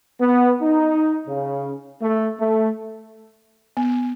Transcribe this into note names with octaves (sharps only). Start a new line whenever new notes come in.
B3
D#4
C#3
A3
A3
B3